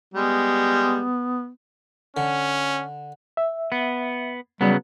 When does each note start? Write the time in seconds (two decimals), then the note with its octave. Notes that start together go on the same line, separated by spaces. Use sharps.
0.14 G3 G#3 B3
2.17 D3 C#4
3.37 E5
3.72 B3
4.61 C#3 F#3 G3 B3